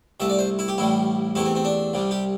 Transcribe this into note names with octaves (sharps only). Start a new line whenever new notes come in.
C2 C3 A3 E5
D5
C5
E4
G4
A1 A2 G3 E4
E2 C3 A3 E4
C4
C4
D4
C2 C3 G3
G4